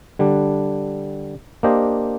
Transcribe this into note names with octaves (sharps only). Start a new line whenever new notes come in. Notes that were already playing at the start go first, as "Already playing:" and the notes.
D3 G3 D4
A#3 D4 G4 C5 D#5